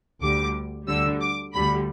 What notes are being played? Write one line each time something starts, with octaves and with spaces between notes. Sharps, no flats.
D2 D3 G3 D6
D2 D3 G3 E6
D6
D2 D3 G3 B5